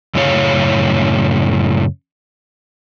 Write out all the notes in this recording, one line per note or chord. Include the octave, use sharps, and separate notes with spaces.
F#2 A2 C#3 E4 C#5 F5